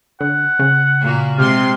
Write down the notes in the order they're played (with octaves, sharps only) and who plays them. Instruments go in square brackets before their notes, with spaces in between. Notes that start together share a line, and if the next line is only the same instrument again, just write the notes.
[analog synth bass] D3 [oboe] F#5
[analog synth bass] C#3
[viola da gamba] A#2 A#3 F#4
[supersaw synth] C3 C6 [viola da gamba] G#3 [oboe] F4